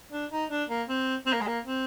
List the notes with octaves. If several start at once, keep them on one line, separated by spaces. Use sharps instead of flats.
D4
D#4
D4
A#3
C4
C4
A#3
G#3
A#3
C4